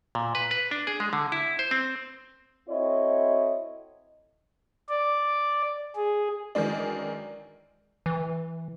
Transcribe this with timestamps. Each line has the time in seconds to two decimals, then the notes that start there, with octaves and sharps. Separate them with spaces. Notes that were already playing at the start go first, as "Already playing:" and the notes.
0.15 A#2
0.35 B4
0.51 B4
0.71 D4
0.87 G#4
1.00 G#3
1.13 D3
1.32 E4
1.59 C5
1.71 C4
2.69 C4 E4 F#4 A4 C#5 D#5
4.89 D5
5.96 G#4
6.55 F#2 D#3 E3 G#3 D4
8.06 E3